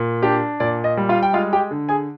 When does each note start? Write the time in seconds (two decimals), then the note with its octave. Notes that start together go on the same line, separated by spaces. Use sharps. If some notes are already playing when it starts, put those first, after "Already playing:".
Already playing: A#2
0.23 D4 G4 G5
0.60 A#2 D5
0.84 D#5
0.97 G3
1.09 F4 F5
1.23 G5
1.33 G#3 F4 F5
1.53 G4 G5
1.71 D3
1.89 G#4 G#5